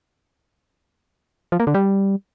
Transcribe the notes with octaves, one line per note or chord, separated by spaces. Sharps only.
F3
A#3
D3
G3